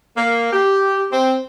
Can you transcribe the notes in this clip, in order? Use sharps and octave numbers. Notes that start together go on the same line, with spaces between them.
A#3
G4
C4